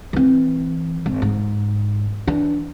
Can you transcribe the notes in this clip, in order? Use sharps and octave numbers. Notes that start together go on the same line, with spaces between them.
E3 C4
G#1
G#2
E3 D4